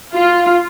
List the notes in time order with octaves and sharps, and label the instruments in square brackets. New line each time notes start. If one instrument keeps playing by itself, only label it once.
[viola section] F4